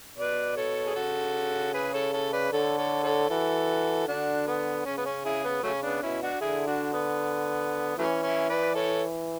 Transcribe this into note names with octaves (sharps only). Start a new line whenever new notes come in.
B2 B4 D5
A4 C#5
G#4
C#3 F#4 A4
G#4 B4
A4 C#5
A4 C#5
B4 D5
D3 A4 C#5
A4 C#5
A4 C#5
E3 F#4 A4
D3 D4 F#4
B3
C#3 C#4
B3
C#4
E4 G#4
B3
C#3 F#3 A3 C#4
B3 D4
B2 C#4 E4
D4 F#4
D3 E4 G#4
D4 F#4
B3
E3 F#3 A3 C#4
C#4 E4
B4 D5
A4 C#5